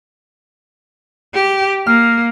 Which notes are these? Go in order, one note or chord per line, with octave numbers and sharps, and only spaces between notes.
G4
A#3 F6